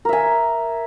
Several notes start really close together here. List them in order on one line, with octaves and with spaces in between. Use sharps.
A#4 E5 G#5